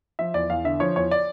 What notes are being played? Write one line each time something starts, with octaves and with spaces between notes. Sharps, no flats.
F3 E5
E2 D5
E2 F5
D3 E5
F3 C#5
E2 C#5
D5